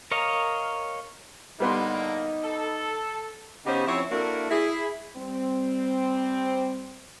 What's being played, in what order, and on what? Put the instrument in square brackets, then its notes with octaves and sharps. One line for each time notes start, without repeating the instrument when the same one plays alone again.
[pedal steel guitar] A#4 C#5 D#5 F5 A#5
[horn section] A2 D3 A#3 [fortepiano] G3 B3 C6 [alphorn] D#4
[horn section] A4
[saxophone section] C#3 B3 C#4 D#4 G4 C5
F3 C4 C#4 E4 C#5
A#3 D4 E4 F#4 A4 A#4
E4 G#4
[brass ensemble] G3 C4